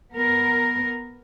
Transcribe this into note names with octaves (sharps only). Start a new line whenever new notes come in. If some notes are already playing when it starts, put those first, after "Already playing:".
B3 A#4